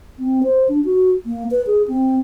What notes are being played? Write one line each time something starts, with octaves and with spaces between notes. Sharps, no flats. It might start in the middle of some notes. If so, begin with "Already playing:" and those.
C4
C5
D4
F#4
A#3
B4
G#4
C4